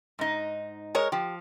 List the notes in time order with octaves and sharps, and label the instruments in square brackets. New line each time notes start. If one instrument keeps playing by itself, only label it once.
[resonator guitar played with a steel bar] G#2 D#4
[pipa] G#3 A#4 C#5
[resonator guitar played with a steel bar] F3 [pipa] G4